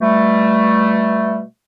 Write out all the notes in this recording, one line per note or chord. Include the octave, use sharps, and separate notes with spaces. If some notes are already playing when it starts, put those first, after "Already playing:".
B2 G3 A3